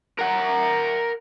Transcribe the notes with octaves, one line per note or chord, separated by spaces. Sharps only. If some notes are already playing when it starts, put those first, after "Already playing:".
A#4 F#5